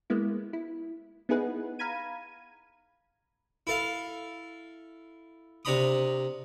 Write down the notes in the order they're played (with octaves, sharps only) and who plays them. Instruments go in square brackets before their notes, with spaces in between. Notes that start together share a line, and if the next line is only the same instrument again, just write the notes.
[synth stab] G#3 A#3 B3 E4
E4
B3 D#4 E4 G#4 B4 F#5
F5 A#5 B5 G#6 D#7
[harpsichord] E4 A4 F5
C3 D4 A#5 B5 D#6